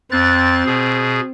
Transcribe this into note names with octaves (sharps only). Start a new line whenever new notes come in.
F2 C4 F#6 A6
B2 G#4